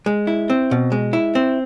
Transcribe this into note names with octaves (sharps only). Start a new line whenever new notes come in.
G#3
E4
C4
B2
G#3
E4
C4